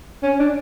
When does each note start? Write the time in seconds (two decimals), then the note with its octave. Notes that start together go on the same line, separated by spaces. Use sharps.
0.23 C#4
0.39 D4